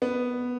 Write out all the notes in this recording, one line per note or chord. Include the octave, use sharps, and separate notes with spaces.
B3